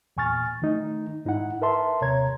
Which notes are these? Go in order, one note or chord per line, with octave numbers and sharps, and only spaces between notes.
E2 A#2 G#5 C#6 F6 A6
D#3 A3 D#4
G#2 D#4 E4 F#5
A#4 B4 E5 A5 C6
D#2 C3 C#5 A#5 G#6